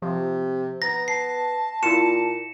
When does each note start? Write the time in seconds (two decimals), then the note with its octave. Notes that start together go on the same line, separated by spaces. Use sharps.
0.02 C3 F3
0.82 B3 A#5 A#6
1.08 A5 C7
1.83 A#2 E4 F4 C#7 E7